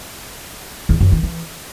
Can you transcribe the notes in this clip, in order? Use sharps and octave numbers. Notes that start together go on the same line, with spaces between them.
E2
F#2
D#3
E3